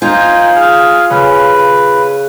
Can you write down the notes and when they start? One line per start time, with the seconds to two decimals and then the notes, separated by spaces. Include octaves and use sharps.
0.02 D#4 F4 C5 G#5
0.56 G#4 F6
1.10 C#3 B4